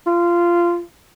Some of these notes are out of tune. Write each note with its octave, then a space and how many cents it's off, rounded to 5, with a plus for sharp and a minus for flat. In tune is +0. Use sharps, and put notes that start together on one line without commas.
F4 -15